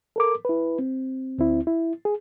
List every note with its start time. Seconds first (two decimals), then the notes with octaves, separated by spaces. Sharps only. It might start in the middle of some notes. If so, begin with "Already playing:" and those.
0.16 A4 A#4 D6
0.45 E4 B4
0.79 C4
1.38 D2 C4 E4
1.67 E4
2.05 G#4